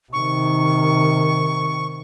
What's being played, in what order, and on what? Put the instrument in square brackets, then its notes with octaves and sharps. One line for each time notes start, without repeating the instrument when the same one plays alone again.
[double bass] C3 D#3 [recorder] C#6